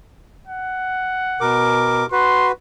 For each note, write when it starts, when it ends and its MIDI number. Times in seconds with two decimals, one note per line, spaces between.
0.47 1.70 78
1.41 2.06 47
1.41 2.06 70
1.41 2.06 86
2.12 2.52 66
2.12 2.52 71
2.12 2.49 84